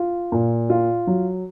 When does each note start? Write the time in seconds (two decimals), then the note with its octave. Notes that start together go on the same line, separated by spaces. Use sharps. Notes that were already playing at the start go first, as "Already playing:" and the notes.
Already playing: F4
0.32 A#2
0.70 F4
1.07 F#3